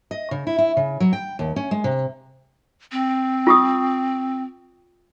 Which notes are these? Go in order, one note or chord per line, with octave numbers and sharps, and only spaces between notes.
D#5
C#3
E4
E4
C#3
F#3
G5
D#2
C#4
G#3
C3
C4
F4 C#6 D#6